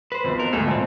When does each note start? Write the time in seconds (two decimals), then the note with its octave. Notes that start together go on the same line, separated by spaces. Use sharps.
0.12 B4 C5
0.24 B1 F2
0.39 A#4
0.53 D2 G#2 G#4 A4
0.67 F2 A#2 C4